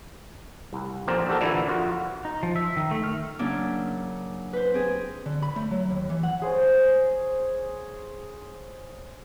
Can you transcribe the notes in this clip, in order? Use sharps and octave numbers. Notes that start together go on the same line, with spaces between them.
C2
A#1 F2 C4 A#4 C5 D5
C4 D4 F#4 G4 A4 A#4
A#2 D3 E3 A#3 E4
F2 F4 F#4
D#4
F3
E5
D#3
A3
F6
C#3 F#3 A#3 C#4 D4 E4
B4 C5
C4 G#4
D3
B5
A3
F#3
D#2
E3
F#5
G#4 C5 C#5